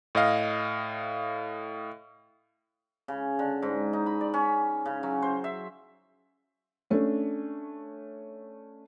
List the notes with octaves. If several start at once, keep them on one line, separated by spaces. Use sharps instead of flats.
A2 D#5 F5
C#3
D3
G#2
D#4
B5
D5
C#4
C#3
F#3
C5
E5
A3 C#4 D4